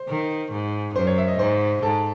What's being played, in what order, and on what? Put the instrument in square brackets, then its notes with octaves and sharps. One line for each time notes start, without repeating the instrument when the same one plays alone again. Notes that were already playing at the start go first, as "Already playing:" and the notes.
Already playing: [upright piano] C5
[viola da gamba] D#3
G#2
[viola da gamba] F#2 [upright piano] C5
[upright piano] C#5
E5
D#5
[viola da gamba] G#2 [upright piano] C5
[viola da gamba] G#2 [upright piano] A4